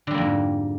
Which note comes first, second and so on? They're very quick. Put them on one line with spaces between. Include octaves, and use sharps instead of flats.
D3 G3 A#3 F2 G#2